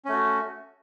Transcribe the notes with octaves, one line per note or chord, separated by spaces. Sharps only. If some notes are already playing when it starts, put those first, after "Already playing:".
A3 C#4 F#4